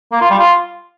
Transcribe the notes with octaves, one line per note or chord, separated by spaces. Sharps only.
A#3
F4
G3
F4